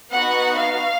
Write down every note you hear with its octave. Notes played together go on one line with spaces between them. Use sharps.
B3 D#4 F#4 F#5
F5